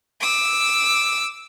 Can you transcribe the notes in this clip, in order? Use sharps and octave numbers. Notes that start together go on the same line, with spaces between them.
D6 E6